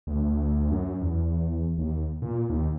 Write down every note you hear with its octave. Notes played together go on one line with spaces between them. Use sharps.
D2
F#2
E2
D#2
A#2
D#2